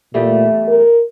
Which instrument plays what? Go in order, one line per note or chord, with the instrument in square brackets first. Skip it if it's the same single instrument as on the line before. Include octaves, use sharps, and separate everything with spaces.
[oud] E2 G3 A3 [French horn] A#2
[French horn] A#4